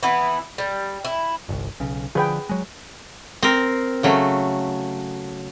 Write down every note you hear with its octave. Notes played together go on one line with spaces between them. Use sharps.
E3 B3 E4
G3
E4
G1 C2
B1 C#3
D3 F3 G#4 B4 G5
F#3 G#3
C4 A#4
C#3 F#3 A3